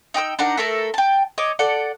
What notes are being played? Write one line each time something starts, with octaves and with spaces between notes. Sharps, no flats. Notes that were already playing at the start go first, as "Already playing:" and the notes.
D#4 G5 D#6 E6
D4 D#4 A#4 F#5
A3 A4 A#4 E5
G5 A5
C#5 D#5 D6
A4 D5 F#5